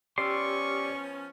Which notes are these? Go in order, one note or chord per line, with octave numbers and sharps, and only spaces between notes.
F3 B3 C#4 G4 D5 C6 C#6 E6